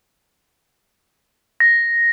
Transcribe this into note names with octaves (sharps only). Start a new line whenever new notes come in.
A#6